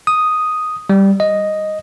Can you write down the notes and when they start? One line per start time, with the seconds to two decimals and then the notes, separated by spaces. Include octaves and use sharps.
0.07 D#6
0.90 G3
1.20 D#5